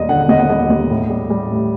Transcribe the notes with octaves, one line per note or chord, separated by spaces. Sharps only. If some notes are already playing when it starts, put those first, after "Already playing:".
Already playing: D#2 G3 D5 D#5
D3 F#5
D#2 D#5
F#5
G3 D#5
D#2
A2
G3
G3
A2